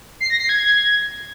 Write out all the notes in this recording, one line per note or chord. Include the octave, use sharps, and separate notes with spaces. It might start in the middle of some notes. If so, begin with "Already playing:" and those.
C7
A#6
C7
G#6